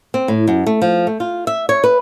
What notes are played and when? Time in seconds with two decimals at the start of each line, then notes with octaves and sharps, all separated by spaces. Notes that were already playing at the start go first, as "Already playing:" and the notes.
0.14 C4
0.28 A2
0.48 F#2
0.67 A3
0.82 F3
1.07 A3
1.20 F4
1.47 E5
1.69 C#5
1.84 B4